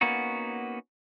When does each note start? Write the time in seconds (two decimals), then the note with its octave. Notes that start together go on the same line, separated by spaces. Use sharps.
0.01 A#3 B3 C#4 D#4 F#4